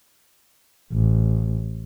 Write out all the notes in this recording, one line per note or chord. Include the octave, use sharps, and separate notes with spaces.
A1